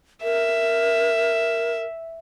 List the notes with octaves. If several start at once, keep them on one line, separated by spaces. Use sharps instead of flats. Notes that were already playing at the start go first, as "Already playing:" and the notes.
A#4 E5